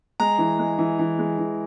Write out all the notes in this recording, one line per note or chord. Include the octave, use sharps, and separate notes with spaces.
G#3 A#5
E3
G#3
E3
E3
G#3
E3